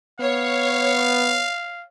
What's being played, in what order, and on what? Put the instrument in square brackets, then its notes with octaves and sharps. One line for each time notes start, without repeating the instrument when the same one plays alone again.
[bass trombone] B3 [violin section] C#5 [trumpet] F5